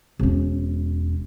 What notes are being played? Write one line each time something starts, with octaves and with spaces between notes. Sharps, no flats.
E1 C#4